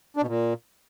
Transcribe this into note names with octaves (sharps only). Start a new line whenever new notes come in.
D4
B2
A#2